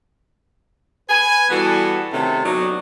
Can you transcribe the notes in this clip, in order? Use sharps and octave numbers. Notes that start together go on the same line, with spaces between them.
B4 G#5
E3 G3 B3 F#4 A4
C3 D#3 A3 C#4 A4
F#3 B3 D4 D#4